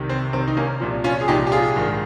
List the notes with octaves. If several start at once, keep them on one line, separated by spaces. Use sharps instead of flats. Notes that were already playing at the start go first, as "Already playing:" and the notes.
Already playing: C2 C3 D#3
C4
C2 C3 D#3 C4
D#4
A#3 C#4
C2 A#2 F3
C#4 F4
G#4
C2 A#2 F3 D#4 G4
G4
F4 G#4
A#1 G#2 D#3